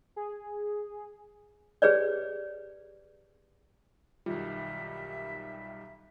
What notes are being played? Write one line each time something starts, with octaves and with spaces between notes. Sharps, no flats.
G#4
G4 G#4 B4 C#5 D5
B1 D#3 G3 F4 E5